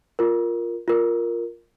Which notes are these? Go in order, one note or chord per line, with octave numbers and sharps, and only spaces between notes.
F4 A#4
F4 A#4